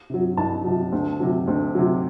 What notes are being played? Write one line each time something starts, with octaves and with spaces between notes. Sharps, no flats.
C3 F#3
C2 A5
C3 F#3
D2
C3 F#3
D2
C3 F#3